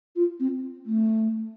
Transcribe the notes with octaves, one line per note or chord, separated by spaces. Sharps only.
F4
C4
A3